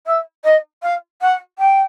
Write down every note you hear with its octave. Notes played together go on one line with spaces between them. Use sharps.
E5
D#5
F5
F#5
G5